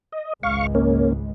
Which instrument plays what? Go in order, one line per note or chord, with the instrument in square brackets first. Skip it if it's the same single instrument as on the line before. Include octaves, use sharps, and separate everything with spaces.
[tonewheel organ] D#5
[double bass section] G#1 C#2 G#3 [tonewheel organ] F5 C#6
[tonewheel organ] A#3 C#4